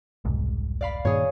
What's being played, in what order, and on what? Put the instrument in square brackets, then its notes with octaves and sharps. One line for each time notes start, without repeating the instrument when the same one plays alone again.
[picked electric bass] E1 C2 G#2
[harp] D5 F5 B5
[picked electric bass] G2 A#2 D#3 [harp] G#4 C#5